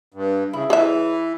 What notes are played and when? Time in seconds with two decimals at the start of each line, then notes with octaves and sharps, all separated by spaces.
0.14 G2
0.53 C#3 E4
0.70 E3 G#4 C#5 E5